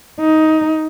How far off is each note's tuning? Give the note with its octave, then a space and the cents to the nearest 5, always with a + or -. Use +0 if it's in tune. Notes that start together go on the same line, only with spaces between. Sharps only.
D#4 +15